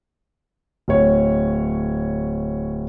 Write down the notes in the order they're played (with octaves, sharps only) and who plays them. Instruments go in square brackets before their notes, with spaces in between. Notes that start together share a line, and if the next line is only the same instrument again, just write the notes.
[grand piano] D1 C#5